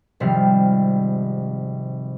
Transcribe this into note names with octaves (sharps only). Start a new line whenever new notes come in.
G#1 C3 F3 G3 F5